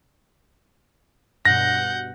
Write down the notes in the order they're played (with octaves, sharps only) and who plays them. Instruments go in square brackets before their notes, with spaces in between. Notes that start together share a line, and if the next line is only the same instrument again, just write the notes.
[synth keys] G2 B2 [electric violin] F#5 G6 [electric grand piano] A#6